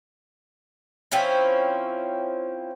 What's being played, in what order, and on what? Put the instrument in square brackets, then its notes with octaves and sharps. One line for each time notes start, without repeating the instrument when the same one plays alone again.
[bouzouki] F3 C4 C#4 E4